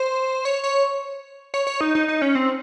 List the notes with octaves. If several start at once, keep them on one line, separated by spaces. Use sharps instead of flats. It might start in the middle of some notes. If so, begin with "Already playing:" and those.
Already playing: C5
C#5
C#5
C#5
C#5
D#4
D#4
D#4
C#4
C4